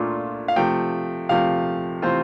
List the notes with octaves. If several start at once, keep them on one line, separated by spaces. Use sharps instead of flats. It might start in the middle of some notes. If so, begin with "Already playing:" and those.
Already playing: A#2 A3 D4 F4
F5
C3 F3 A3 G5
C3 F3 A3 F5
C3 E3 A3 C4 F4 C5